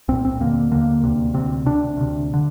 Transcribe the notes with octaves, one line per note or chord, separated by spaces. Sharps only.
C2 A#2 C4
C4
D#2 D3 A#3
D#2 D3 A#3
D2 C3
D2 C3 C4
D2 C3 D4
D2 C3
D3